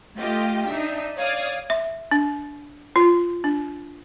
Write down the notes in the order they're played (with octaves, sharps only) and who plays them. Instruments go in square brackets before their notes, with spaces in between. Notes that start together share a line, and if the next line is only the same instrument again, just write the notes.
[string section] A3 F4 G4 D#5
D4 D#4 E5
C#5 D5 F5 D#6 G#6
[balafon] E5
D4
F4
D4